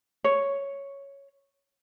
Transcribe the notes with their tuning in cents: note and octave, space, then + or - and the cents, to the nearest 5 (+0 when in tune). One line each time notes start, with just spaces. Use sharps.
C#5 +0